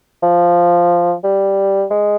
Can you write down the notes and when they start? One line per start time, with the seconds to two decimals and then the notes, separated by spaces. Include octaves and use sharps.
0.23 F3
1.24 G3
1.91 G#3